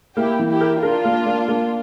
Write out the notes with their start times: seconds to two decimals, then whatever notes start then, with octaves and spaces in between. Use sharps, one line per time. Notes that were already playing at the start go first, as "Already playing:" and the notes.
0.17 A#3 E4 G4
0.39 E3
0.50 E4 G4
0.61 A#4
0.83 D4 F4 A#4
1.05 A#3
1.26 A#3
1.48 A#3